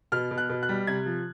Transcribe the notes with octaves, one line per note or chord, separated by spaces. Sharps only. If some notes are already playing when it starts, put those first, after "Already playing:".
B2 F6
B2
F#6
B2
F#6
G3
C3 G#6
F3